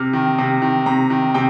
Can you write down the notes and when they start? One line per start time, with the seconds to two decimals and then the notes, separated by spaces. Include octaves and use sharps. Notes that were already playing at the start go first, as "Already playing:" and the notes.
Already playing: C3 F6
0.13 D#3
0.38 C3
0.62 D#3
0.86 C3 A#5
1.10 D#3
1.34 C3 G5